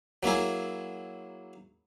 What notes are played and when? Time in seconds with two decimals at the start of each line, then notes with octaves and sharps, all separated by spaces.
0.23 F#3 A#3 E4 G#4